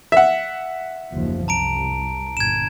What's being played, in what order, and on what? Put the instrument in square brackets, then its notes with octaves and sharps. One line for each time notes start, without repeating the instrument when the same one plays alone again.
[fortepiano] E5 F#5
[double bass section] F#1 D#2 F3
[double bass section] C2 [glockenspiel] A5 A#5 D7
[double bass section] G1 A#2 [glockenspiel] G#6 E7